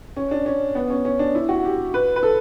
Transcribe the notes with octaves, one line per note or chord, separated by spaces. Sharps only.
C#4
D4
C#4
B3
C#4
C#4
D4
E4
F#4
G4
B4
B4
A4